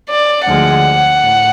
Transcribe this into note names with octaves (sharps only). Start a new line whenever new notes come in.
D5
D2 D3 F3 G#3 F#5
A2